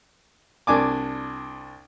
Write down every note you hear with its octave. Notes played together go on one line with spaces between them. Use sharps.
C2 D4 G#5 D6